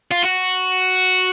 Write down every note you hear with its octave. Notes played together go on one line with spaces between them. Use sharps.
F4
F#4